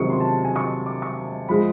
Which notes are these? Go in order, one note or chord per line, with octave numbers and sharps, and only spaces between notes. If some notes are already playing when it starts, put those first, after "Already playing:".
Already playing: C#2 C3 D#3 F#3 C#6 D#6
C6
A5
G#5
C#6
D6
C#6
F3 G#3 B5